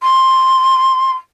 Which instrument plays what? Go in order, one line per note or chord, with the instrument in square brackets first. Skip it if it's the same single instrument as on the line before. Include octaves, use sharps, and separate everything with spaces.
[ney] C6